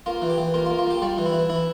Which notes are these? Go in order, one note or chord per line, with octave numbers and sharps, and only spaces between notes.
A#3 F4
E3
G4
E3
A#3 F4
F4
A#3
F4
A#3 G4
G3 F4
E3
E4
E3
E3 E4